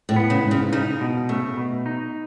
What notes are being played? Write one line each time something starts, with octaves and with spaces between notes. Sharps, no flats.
A2
B3
C#3
G#2
C#3
C#3 D#4
B2
C#3 A3
B2
D#4